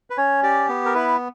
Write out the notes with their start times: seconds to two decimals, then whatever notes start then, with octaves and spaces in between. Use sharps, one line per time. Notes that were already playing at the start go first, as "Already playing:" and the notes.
0.10 B4
0.17 C#4 C#5
0.43 G4 D5
0.69 B3
0.85 A#4
0.94 E4 B4